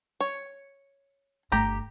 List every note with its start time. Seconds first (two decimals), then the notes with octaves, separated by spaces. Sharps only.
0.20 C#5
1.52 G1 A3 G4 A#5